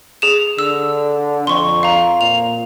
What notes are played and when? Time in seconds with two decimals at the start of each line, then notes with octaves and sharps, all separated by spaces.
0.22 G#4 E7
0.59 D3 E6
1.47 F2 C6 C#6
1.83 F5 A#5
2.21 A#2 F7